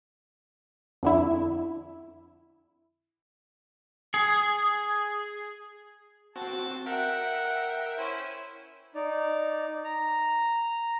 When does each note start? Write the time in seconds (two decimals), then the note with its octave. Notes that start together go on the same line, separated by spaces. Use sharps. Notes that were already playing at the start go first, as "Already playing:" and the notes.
1.03 F2 D3 E4
4.14 G#4
6.36 C4 F#4 A5
6.86 A#4 E5 F#5 G5
7.98 C#4 E4 C5
8.95 D#4 D5
9.84 A#5